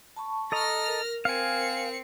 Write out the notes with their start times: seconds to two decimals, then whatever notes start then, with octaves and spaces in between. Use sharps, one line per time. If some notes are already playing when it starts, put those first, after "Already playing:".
0.16 A5 B5 C#6
0.52 A4 D#5 A#5 F6 A#6
0.88 A#4
1.25 C4 F5 G#5 C#7